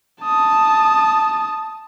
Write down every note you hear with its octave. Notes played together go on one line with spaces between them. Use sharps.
A5 D#6